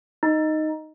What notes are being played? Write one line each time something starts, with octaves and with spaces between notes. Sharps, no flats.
D#4